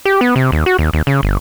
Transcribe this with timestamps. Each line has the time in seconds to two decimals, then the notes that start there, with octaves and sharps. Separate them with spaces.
0.05 G4
0.21 B3
0.36 C3
0.52 D#2
0.66 F#4
0.79 D#2
0.93 D#2
1.07 C#3
1.23 G1